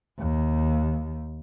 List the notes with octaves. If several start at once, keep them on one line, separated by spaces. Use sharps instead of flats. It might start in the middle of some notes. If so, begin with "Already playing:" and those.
D#2